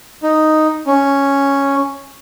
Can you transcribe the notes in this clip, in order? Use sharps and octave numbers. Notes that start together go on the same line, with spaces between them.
D#4
C#4